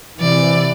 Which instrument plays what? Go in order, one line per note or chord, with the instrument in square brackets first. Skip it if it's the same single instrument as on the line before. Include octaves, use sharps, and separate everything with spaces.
[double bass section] C3 E3 [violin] D5